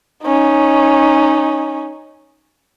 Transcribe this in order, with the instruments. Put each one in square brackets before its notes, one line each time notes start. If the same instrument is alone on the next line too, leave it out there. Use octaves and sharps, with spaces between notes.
[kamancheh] C#4 D#4